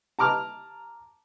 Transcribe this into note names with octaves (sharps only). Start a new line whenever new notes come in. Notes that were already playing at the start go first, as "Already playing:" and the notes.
A5 A#5 D6 F6